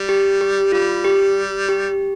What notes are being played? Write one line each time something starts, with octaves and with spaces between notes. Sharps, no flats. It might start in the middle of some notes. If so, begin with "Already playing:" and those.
Already playing: G3
G4
G4
G3 F4
G4
G4